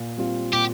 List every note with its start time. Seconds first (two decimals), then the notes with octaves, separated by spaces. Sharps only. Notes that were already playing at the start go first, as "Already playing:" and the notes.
Already playing: A#2
0.17 G3 C4 F4
0.53 A#2 G4